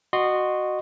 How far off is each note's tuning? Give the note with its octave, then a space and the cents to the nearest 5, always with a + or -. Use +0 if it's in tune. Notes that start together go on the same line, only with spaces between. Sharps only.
F#4 +0 D#5 -25 C6 +0